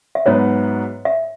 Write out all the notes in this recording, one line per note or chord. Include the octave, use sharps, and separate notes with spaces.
E5
G#2 F#3 B3 F#4 B4 C#5
E5